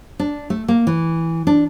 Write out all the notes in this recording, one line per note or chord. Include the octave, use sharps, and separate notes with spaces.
D4
A3
A#3
E3
D4